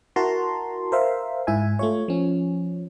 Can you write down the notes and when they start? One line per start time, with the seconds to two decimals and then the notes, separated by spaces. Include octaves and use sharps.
0.16 E4 F#4 A#4 A5 A#5 C6
0.92 A#4 C5 E5 F5
1.47 G#2 E4 E5 G#5
1.79 A3 F4 C#5
2.08 F3 C#4